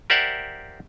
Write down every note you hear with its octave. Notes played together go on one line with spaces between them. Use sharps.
G4 A#4 C5 D5 E5 F#5